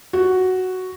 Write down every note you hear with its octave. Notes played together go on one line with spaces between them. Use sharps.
F#4